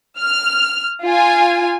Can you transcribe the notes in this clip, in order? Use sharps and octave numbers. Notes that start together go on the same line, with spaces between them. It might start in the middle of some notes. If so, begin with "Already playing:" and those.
F6
F4 G#5